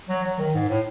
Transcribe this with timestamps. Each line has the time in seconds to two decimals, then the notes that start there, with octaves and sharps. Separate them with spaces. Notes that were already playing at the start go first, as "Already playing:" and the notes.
0.09 F#3
0.24 F#3
0.39 D#3
0.55 G#2
0.69 A2